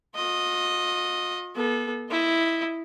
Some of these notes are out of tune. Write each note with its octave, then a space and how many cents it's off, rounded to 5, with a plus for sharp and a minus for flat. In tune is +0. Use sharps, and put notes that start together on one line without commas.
F4 +45 D#5 +0
B3 -40 A4 -30
E4 +0 D#5 +0